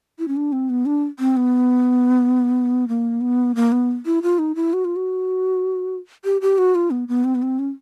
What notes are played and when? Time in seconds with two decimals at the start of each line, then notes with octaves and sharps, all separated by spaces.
0.19 E4
0.28 C#4
0.36 D4
0.52 C4
0.70 B3
0.86 D4
1.19 C4
1.37 B3
2.88 A#3
3.21 B3
3.55 A#3
3.72 B3
4.06 E4
4.23 F4
4.39 D#4
4.55 E4
4.73 F#4
4.85 F4
4.96 F#4
6.25 G4
6.41 G4
6.58 F#4
6.75 F4
6.91 B3
7.08 B3
7.24 C4
7.35 B3
7.42 C4
7.59 C#4